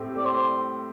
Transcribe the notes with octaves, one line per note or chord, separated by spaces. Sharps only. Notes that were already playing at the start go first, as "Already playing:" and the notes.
Already playing: A2 A3 C4 G4
A3 D5
C5